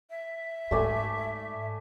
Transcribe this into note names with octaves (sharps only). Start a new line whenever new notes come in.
E5
G#2 A3 D5 G#5